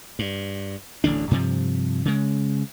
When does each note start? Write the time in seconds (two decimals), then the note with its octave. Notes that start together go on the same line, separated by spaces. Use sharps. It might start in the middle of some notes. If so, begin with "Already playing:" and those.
0.19 G2
1.04 D1 A1 D3 D4
1.31 G2 C3 F3
2.05 C#3 G#3